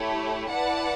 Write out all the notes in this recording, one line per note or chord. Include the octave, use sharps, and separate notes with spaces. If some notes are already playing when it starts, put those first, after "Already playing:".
Already playing: A3 E4 G4 C#5
E4 B4 D5 F#5 A5